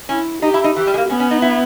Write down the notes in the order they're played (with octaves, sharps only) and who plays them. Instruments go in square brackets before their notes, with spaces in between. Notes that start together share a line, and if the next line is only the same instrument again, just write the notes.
[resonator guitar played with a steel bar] C#4 [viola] E4
[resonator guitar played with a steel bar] D#4 [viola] G4
[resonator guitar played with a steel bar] E4
D#4
[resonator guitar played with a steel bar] E3 [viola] G4
[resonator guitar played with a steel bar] G3
G#3
A#3
[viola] B3 [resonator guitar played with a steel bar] C#4
[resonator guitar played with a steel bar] C#4
D#4
E4